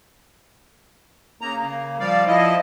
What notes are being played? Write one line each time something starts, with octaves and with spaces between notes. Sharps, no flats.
C#3 A#3 A#5
C#3 A#3
F3 G3 D5 F5
F3 E4 D#5